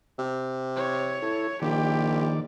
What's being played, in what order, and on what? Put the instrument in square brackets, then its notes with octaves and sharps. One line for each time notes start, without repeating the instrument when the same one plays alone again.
[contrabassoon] C3
[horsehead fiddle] C#5
[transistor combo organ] E4 A4
[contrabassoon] A#1 [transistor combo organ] D#3 D5 [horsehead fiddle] G4